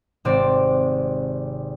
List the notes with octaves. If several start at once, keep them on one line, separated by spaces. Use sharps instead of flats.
G#1 C3 C4 D5